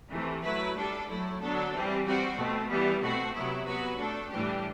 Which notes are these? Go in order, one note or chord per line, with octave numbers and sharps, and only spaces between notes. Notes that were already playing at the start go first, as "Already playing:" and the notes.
C3 E3 A3
F#3 A3 E4 B4
G3 D4 A4
A2 F#3 A3 E4
D3 F#3 B3 D4 A4
E3 G3 C4
G3 C4 F#4
B2 A3 C4
E3 G3 B3
B2 A3 C4 F#4
C3 F#3 B3 E4
F#3 B3 F#4 B4
A3 D4 A4
A2 E3 G3 D4 G4